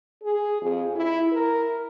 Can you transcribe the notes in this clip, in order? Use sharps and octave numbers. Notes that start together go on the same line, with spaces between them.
G#4
F2
E4
A#4